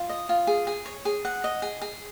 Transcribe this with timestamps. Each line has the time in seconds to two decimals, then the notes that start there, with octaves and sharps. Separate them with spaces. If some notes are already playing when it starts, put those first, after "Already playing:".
Already playing: F4
0.10 D#5
0.29 F4
0.47 G#4
0.67 G#4
0.86 C#5
1.05 G#4
1.25 F#5
1.44 D#5
1.62 G#4
1.82 G#4